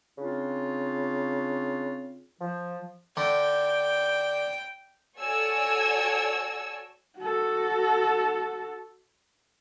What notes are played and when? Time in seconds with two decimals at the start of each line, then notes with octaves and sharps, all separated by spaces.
0.18 C#3 C4 D4 F4
2.40 F3
3.17 D3 G5
5.19 F#4 A4 C#5 D5 G#5 E6
7.19 F#4 A4